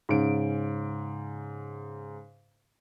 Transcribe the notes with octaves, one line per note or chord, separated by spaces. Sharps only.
G#2 C#3 D7